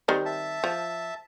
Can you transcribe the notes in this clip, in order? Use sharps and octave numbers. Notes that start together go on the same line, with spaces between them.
D#3 G3 C4
E5 A5
F3